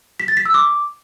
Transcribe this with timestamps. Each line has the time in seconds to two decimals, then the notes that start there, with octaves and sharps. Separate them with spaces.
0.20 B6
0.28 A6
0.37 B6
0.46 E6
0.54 D6